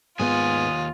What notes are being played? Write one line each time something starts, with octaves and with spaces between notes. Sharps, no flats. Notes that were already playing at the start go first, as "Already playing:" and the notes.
D#2 G#2 G#3 B3 F4 G#5 D#6